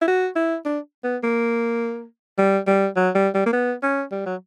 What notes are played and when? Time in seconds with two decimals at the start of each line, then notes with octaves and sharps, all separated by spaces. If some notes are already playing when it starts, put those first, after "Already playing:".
0.02 E4
0.08 F#4
0.36 E4
0.65 D4
1.04 B3
1.23 A#3
2.38 G3
2.67 G3
2.96 F#3
3.15 G3
3.34 G3
3.46 A#3
3.53 B3
3.83 C#4
4.12 G3
4.26 F#3